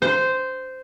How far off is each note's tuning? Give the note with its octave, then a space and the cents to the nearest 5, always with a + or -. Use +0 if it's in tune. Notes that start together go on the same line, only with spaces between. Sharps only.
C5 -10